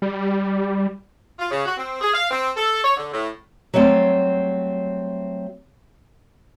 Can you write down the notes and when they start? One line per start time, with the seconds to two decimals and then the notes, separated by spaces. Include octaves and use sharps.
0.02 G3
1.39 F4
1.51 C#3
1.66 F#4
1.78 C4
2.01 G#4
2.14 F5
2.31 C4
2.57 A4
2.84 C#5
2.97 D3
3.13 A2
3.74 F#3 G3 A3 C4 G4